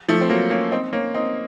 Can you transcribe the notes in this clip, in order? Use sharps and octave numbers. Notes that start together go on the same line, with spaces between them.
F3 A3
C4
F#3 A#3
A#3 C#4
C4 D#4
A#3 C#4
C4 D#4